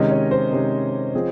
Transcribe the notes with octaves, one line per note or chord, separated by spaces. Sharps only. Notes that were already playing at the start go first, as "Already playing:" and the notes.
Already playing: C3 D#3 G#3 C#4 D#5
C#5
C5
C3 D#3 G#3 C#4
F3 C4 F4 G#4